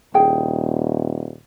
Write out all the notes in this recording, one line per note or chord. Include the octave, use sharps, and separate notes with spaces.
D#1 E4 G#4 G5